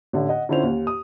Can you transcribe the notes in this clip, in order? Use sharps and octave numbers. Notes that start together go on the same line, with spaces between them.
A1 D3
D#5 F#5
D3 C#4 E4 F4 C5 F7
D#2
D#6